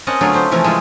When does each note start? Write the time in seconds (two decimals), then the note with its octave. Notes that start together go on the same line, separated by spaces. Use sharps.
0.07 C4 C#4 A#4 D#5 F#5 A5
0.21 D3 F#3 A3 B3 F4 G#4
0.33 A3 C4 G4 C5
0.51 C3 E3 F3 A3 C#4 A#4
0.64 G#3 C4 E4 F4